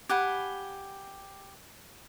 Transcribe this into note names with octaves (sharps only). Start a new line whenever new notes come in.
G4 F#5 G#5 B5